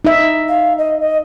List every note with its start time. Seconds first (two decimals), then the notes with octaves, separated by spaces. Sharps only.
0.05 D#4 E5
0.48 F5
0.78 D#5
1.00 D#5